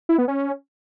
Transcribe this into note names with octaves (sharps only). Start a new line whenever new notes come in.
E4
B3
C#4